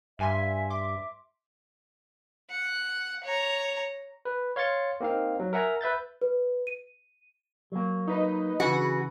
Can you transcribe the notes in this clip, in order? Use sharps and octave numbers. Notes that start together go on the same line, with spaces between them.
G2 E5 F5 G#5 C6
E5 C6 D6
F#5
C#5 A#5
B4
C#5 F5 C6 A6 C#7
A#3 C4 D#4 F5
F#3
A#4 E5 F#5 G#5 A#5
B4 E5 G6 A6
B4
D#7
F#3 A#3
D#4 B4 D#5
C#3 E3 F#4 G#4 B4